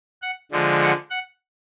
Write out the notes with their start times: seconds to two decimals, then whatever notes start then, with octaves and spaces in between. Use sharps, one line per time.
0.22 F#5
0.52 D3 F3 G#3
0.81 F#5
1.10 F#5